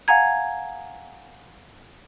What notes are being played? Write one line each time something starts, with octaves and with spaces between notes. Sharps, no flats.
F5 F#5 G#5 A#5 G#6